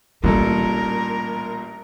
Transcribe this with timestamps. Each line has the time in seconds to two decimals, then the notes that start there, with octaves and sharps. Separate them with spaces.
0.24 A1 A#2 G3 D4 A4 A#4